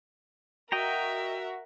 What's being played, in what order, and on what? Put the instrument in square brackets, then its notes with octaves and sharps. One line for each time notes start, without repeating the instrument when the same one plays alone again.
[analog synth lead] F#4 [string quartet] A#4 E5 [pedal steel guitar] D#5 G5 A#5